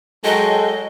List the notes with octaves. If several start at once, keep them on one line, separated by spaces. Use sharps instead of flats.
F#3 G#3 F#4 A4 D#5 G5